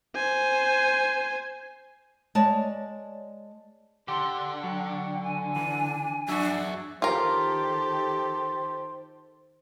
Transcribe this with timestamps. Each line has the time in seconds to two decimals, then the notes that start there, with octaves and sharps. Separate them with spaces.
0.16 C5 G#5
2.35 G#3 C#5 D5 A5
4.08 D3 G4 C6
4.64 F#3 G5
5.23 G#5
5.56 E3 D4
6.29 F#3 D4 F#4 G#4 E5
7.02 D#3 F4 G4 A4 A#4 C5